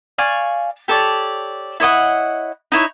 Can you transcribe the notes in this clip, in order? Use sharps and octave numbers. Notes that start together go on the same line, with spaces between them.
D5 F5 G#5 C#6
G4 A4 C#5 D5
E4 C#5 D#5 F#5
D#4 E4 C#5